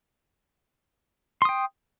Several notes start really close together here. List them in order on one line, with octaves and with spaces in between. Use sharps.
C6 D#6 G5